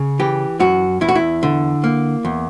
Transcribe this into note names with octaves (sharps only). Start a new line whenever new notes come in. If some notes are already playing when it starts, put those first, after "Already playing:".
Already playing: C#3
E3 G4
F#2 F#4
E2 E4
F#4
E4
D3
A#3
E2